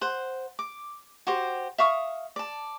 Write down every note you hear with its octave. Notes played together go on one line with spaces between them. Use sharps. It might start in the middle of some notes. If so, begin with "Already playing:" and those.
C5 F#5
D6
F#4 G4 C5
E5 F5 C#6 D#6
D5 A5